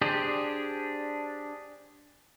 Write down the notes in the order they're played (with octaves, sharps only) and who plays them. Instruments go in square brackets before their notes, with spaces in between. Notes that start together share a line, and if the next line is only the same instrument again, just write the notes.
[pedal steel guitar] D4 G4 G#4 C5